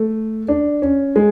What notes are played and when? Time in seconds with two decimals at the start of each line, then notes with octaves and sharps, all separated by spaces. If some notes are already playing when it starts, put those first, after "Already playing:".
Already playing: A3
0.48 D4
0.82 C#4
1.16 G#3